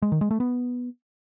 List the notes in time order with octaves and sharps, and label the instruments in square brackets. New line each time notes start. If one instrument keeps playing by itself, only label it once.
[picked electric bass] G#3
D#3
G#3
A3
B3